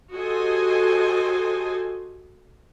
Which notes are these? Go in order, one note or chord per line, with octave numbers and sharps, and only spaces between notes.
F#4 G4 A4 C5 D#5 G#5